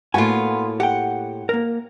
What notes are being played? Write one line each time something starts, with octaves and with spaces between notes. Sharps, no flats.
A2 A#3 B3 F4 F#4 G#5
G4 F#5 G5
A#3 A#4